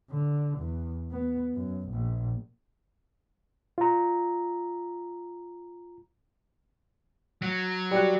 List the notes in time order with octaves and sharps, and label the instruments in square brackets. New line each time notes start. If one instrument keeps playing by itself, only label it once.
[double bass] D3
E2
B3
F#2
A#1
[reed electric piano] F4 A#5
[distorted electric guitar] F#3
[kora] G3 F#4